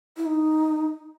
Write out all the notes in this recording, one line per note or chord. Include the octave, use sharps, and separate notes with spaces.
E4
D#4